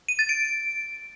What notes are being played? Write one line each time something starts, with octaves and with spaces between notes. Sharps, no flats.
D#7
A6
D7